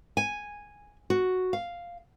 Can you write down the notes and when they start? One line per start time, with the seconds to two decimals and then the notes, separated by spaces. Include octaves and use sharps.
0.17 G#5
1.10 F#4
1.53 F5